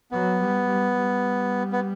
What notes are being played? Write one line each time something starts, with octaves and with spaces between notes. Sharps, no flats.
F#3 B3
G3
G3
G3
B3